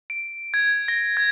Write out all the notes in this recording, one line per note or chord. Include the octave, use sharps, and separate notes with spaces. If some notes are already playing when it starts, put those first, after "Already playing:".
D7
G#6
A#6
G#6